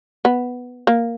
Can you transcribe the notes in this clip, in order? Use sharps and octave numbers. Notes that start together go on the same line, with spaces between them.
B3
A#3